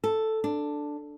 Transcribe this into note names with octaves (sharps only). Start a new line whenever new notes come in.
A4
D4